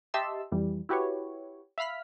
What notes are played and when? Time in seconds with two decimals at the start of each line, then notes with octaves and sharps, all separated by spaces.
0.14 G4 D#5 E5 A5 C6 E6
0.52 F2 E3 G3
0.89 E4 F#4 G4 B4 C#5
1.78 E5 F5 B5 F6 B6